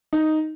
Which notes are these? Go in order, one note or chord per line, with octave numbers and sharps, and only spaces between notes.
D#4